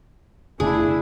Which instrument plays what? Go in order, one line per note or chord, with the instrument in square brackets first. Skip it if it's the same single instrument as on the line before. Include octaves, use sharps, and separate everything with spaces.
[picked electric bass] F1 C#3 A3 [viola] D4 E4 [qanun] G#4